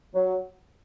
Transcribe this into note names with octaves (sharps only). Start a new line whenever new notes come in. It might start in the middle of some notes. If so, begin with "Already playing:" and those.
F#3